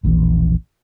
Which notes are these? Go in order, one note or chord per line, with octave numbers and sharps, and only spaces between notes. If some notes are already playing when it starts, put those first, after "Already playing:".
E1 A#1 A#2 E3